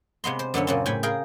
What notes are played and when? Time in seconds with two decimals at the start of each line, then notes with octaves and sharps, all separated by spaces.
0.24 C3 G#3 B3 C6
0.39 C5
0.54 F#2 D3 B3 C#4
0.67 A#2 C#3 C4
0.86 A2 G5 G#5 B5
1.03 G#4 A#4 F5 G5